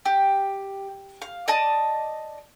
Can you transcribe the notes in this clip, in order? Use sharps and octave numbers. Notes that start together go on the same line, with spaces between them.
G4
F5
D5 D#5 A5